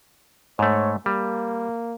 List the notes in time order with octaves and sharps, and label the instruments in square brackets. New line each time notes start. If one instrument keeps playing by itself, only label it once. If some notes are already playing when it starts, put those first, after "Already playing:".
[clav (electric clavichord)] G#2 A3 [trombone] C#5
[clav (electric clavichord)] G3 [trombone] A#3